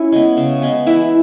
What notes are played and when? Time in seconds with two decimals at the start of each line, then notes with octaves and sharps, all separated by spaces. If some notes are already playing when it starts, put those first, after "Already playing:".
Already playing: C#4 E4
0.12 G#3 B3
0.37 C#3
0.62 G#3 B3
0.86 E3 E4